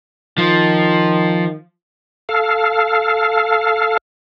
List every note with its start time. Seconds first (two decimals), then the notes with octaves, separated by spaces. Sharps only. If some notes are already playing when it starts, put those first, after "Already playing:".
0.38 D#3 F3
2.29 A4 F5